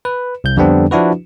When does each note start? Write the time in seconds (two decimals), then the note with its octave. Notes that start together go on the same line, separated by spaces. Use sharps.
0.05 B4
0.44 C2 G6
0.57 F2 D3 G3 B3 C4 D4
0.91 F3 D4 E4 F#4 B4